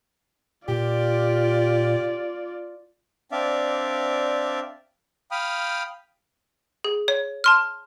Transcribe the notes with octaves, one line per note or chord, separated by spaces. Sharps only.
A#2 F4 G4 D5
C4 D4 D5 E5 F5
F5 G5 B5 D#6 F6
G#4
C#5
A5 C6 F6